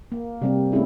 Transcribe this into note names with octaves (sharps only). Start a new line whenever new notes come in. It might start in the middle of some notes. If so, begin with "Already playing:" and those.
A#3
C3 G3 C4
A3 C4 C#4 E4 G#4